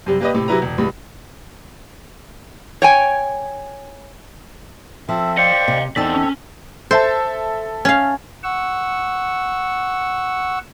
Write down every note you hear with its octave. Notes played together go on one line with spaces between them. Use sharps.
F#2 C3 G3
A#3 G4 B4 D5 D#5
A2 C3
C3 F#3 E4 B4 A#5
E1
C#2 A2 G3
C#5 G5 G#5
F3 C4 A4 E5
C5 D5 D#5 F5 G5 C#7
C3
E2 A2 C4 D#4 A4 D5 A5 B6
C#4
A4 C5 E5 A5
C#4 F5
F#5 C#6 E6